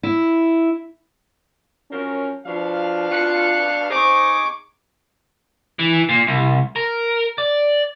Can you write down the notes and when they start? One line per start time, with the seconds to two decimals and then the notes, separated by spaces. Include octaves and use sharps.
0.03 E4
1.90 F3 F#3 C#4 A#4
2.46 B2 F3 D4 F5
3.10 F4 F#6 C#7
3.90 D#4 G#4 C5 C#6 D6
5.79 E3
6.09 A#2
6.27 C2
6.76 A#4
7.38 D5